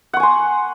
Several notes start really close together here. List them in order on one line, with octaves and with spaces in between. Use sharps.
F#5 C#6 G#5 C6